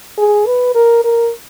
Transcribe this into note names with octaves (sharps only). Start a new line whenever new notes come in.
G#4
B4
A#4
A#4